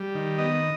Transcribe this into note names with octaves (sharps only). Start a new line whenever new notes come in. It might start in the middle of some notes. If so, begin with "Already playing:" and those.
Already playing: G3
D#3
B3 D#5